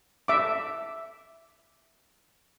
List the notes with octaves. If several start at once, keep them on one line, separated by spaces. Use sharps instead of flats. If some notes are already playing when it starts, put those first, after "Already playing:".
E5 D6